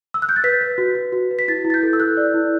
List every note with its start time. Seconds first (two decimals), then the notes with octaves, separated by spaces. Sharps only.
0.14 E6
0.22 F#6
0.29 G6
0.36 A6
0.44 B4 B6
0.61 B4
0.78 F#4
0.95 F#4
1.13 F#4
1.31 B4
1.39 B6
1.48 E4 A6
1.65 E4
1.70 A6
1.74 G6
1.83 A4
1.93 E6
2.00 A4 F#6
2.17 D5
2.34 E4